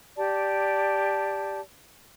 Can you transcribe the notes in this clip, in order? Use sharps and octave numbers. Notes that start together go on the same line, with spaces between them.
G4 D5 A5